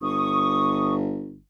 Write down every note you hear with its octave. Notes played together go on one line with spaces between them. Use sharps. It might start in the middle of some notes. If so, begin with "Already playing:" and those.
G1 C#6 D#6